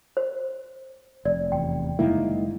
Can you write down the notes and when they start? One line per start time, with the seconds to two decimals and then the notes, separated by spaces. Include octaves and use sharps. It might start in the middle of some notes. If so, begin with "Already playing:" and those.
0.17 C5
1.25 F1 D5
1.52 E2 G5
1.99 F#1 D#3 G3 G#3 A#3 E4